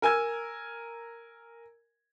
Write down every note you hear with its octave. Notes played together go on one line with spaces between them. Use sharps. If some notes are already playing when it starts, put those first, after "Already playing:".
A#4 G#5 E6 G#6